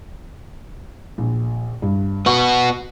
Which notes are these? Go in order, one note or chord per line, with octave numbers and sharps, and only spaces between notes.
A#1
G2
B3 F#4 C#6